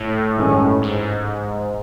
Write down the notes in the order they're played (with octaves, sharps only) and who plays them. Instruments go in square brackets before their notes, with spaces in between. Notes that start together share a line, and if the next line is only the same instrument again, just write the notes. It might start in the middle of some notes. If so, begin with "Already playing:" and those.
Already playing: [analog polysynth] A2
[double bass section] G2 D#3 G#3 C#4
[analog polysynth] G#2